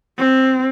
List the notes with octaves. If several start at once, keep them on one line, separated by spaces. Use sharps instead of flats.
C4